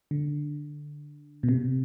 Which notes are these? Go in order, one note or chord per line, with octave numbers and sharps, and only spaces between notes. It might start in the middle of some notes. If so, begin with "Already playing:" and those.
D3
B2
C3